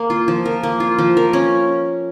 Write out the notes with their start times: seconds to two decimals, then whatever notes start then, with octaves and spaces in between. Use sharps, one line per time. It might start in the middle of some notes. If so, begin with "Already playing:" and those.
Already playing: A#3
0.10 F4
0.28 F3
0.46 A#4
0.63 A#3
0.80 F4
0.99 F3
1.17 A#4
1.33 C#4